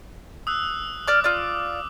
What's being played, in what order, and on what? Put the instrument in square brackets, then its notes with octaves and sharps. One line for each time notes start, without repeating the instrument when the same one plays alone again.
[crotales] D#6 E6 F#6
[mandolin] D5 F6 [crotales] D6
[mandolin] F4 D5